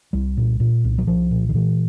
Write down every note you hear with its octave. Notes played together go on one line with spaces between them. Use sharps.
C2 G3
A#2
A#2
C2
F#3
C2 F3
A#2
D#3
A#2 E3